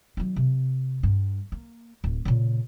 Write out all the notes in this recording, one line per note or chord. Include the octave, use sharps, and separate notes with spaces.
D#3 F#3
C3
G2
A#3
D1
A#2 C#3